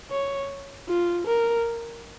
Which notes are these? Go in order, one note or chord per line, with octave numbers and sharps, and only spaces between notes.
C#5
F4
A#4